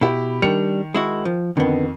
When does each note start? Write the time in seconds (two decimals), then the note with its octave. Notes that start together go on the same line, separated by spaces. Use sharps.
0.01 B2 E4 G4 B5
0.42 D#3 G3 D4 C#7 F7
0.95 G#3 E4 F#4
1.25 F3
1.57 F2 D3 D#3 B3